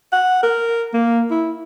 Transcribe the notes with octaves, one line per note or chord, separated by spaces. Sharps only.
F#5
A#4
A#3
E4